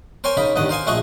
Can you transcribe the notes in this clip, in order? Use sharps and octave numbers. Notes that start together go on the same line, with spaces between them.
A#4 C5 C#5 G5 G#5
C#3 D#4 A#4 B5
A1 G2 D#3 D#5 F#5
A#4 C5 F5 G#5
A#1 A3 F#4 G#4 D#5 C#6